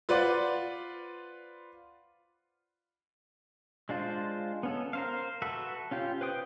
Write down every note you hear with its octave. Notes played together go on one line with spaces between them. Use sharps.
F4 B4 C5 D5 F#5
G#3 D4 F4 C5
B3 C#4 A4
A#4 C5 F5
F#4 A4 B4 E5
C#4 F4 G4
B4 C5 G5 D#6